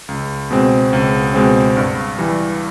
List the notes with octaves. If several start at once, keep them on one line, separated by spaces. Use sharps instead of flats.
C#2
B2 G#3 C4
C#2
B2 G#3 C4
G2
E3 G3